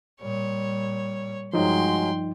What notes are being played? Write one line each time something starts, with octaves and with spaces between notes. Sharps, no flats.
A#2 G3 C#5
G2 F3 F#3 G#3 D#4 G5 C6